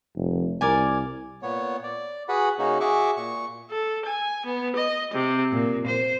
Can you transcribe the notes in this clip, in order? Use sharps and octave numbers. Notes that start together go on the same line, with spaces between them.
F1
C2 A#4 D5 G#5
A#2 B3 C#5
D5
F#4 G#4 B4 F#5 B5
C#3 A#3 C#4 D#4 F#4
F#4 G#4 E5 C#6 D6
A#2 C#6
A4
G#5
B3
D#5
C3
A#2
C5